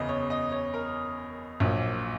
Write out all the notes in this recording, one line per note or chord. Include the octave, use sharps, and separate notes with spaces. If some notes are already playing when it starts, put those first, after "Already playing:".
Already playing: F#1 E2 C#3 D#5
C#5
D#5
C#5
A#4
A#1 A#2 F#3